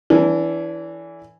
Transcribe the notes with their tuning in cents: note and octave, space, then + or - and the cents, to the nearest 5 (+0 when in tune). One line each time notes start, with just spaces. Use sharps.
E3 +5 D4 -30 A4 +0